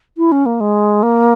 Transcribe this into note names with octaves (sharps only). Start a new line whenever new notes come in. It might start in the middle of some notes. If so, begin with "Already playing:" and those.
E4
C#4
A#3
G#3
A#3